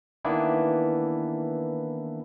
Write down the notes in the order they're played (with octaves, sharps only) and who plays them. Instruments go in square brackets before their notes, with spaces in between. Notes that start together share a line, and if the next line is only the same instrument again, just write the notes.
[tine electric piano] D#3 E3 A#3 B3 D4 E4